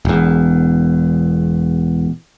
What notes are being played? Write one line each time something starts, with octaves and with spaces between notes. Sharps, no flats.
E1 E2